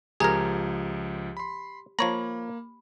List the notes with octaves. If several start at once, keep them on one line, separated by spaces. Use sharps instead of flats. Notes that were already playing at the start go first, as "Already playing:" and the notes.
C#2 F3 G4 G#4 A#4 A#5 G#6
B5 C6
F3 A#3 C#5 A#5 B5